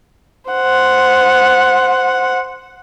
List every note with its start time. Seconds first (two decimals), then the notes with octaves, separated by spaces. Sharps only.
0.51 C5 F#5